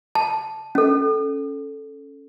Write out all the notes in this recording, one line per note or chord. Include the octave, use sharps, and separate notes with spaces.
A5
C#4 A4